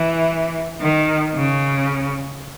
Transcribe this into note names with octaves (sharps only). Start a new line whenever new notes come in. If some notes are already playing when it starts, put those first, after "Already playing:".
Already playing: E3
D#3
C#3